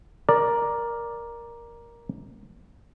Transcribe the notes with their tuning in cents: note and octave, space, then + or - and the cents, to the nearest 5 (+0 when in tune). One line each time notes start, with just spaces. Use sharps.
A#4 +10 D5 +0